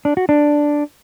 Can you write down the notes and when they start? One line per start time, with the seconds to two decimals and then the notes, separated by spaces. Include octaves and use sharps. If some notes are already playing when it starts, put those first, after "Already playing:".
0.05 D4
0.17 F#4
0.29 D4